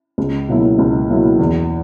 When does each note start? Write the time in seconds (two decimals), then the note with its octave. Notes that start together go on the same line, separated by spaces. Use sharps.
0.18 C#2
0.48 B2 F#3 A#3 E4
0.79 C#2
1.09 B2 F#3 A#3 E4
1.39 E2